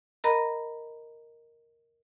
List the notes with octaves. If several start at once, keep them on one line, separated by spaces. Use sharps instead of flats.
A#4 D#5 A#5 B5